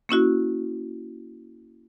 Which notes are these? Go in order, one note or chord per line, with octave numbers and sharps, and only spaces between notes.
A#3 C#4 E4 F#4